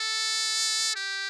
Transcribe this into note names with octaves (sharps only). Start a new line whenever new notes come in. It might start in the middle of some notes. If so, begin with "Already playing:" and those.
Already playing: A4
G4